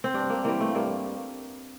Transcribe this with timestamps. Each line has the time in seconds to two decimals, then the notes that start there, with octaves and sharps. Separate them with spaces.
0.04 C4
0.14 G2 D4
0.30 A#3
0.44 E3 G3 A#3
0.61 A3
0.75 G2 A#3